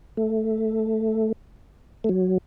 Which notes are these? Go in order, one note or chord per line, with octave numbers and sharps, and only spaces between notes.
A3
A3
F#3